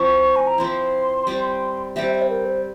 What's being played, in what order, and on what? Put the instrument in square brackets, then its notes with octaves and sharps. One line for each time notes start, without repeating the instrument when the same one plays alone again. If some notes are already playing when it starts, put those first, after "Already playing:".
Already playing: [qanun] F3 C4 E4 [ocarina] C#6
[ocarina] G#5
A#5
[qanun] F3 C4 E4 [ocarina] C6
[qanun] G3 C4 G4
[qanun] G3 C4 G4 [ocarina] E5
[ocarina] E5
C5
A#4
C5